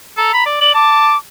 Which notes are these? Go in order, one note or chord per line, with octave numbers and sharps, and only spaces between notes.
A4 A#5
B5
D5
D5 F#7
A5 D6